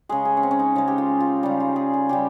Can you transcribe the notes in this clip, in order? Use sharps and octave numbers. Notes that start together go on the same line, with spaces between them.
C#3 G#3 G#4
G#4
C#4
C4
C#4
D#4
C#3 G#3 D#4
G4
F4
F4
C#3 G3 D#4
F4
G#4
G#4
C#3 G3 G4